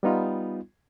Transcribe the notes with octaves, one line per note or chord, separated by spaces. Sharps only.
G3 B3 D#4 F4